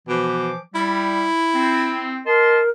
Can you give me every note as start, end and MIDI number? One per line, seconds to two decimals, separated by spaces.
0.08 0.50 47
0.08 0.58 52
0.08 0.58 53
0.08 0.58 86
0.75 1.26 55
0.75 2.21 64
1.55 2.20 60
2.26 2.70 70
2.26 2.60 75
2.26 2.60 81
2.26 2.60 84